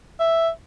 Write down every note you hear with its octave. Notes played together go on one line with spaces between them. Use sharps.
E5